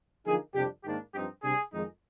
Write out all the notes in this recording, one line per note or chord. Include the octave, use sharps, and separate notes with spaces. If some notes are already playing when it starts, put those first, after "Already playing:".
D3 F3 A#3 D#4 G#4
F2 C3 G3 D4 G4
G#2 D#3 A#3 D4 G4
G2 F3 C4 D#4 G4
C3 G3 D4 G#4
F2 D#3 G#3 D#4